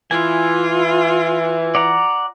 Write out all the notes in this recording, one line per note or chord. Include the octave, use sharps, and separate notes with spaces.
E3 F4 G#5
D5 F#5 A#5